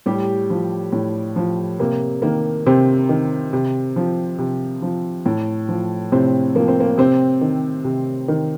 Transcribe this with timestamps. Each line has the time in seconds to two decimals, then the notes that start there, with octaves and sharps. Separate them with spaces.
0.06 A2 G3 G4
0.50 F3
0.92 A2
1.36 F3
1.79 C3 A#3
2.22 D#3 A#3
2.67 C3 C4
3.09 D#3
3.53 C3
3.96 F3
4.39 C3
4.82 F3
5.26 A2
5.69 F3
6.12 A2 C3 C4
6.55 F3 A#3
6.68 C4
6.80 A#3
6.98 C3 C4
7.41 D#3
7.84 C3
8.28 D#3